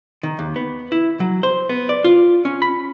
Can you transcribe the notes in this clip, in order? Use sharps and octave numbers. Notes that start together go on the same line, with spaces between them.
D#3
D#2
B3
E4
F#3
C5
B3
D5
F4
C#4
B5